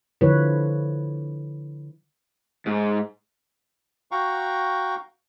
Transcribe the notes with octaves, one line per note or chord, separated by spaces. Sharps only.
D3 F3 E4 B4 C#5
G#2
F#4 F5 G5 A#5 C#6